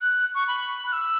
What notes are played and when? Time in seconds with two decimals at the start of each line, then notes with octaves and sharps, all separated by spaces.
0.02 F#6
0.35 C#6
0.48 B5
0.86 F#6
0.93 E6